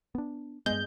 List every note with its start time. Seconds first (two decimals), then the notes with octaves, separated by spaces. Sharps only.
0.15 B3 D4
0.66 G2 G#3 B3 G6